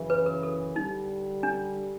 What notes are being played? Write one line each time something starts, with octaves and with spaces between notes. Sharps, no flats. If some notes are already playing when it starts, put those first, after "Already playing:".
Already playing: F#2 C#3 E3
B4
A#4
A4
G2 D3 G3 D#4
D4